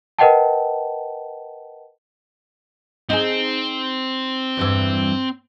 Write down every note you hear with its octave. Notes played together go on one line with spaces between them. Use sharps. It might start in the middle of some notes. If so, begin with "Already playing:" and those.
A#4 B4 D#5 F#5 G5 A5
C4 D#4 G#4
E2 G2 E3